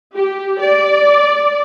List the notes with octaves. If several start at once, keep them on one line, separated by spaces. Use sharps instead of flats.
G4
D5